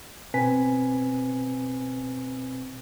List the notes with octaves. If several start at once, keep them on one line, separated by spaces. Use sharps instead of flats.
B2 C4 B4 G#5 B6